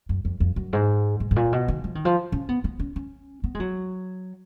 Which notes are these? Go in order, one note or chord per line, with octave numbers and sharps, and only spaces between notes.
F#2
F2
F2
F#2
G#2
G#2
G#2
A#2
B2
D#3
F3
D#3
F3
C#4
B3
B3
C#4
C#4
B3
G#3
F#3